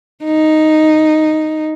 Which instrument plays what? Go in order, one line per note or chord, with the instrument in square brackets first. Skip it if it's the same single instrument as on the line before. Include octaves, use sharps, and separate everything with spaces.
[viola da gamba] D#4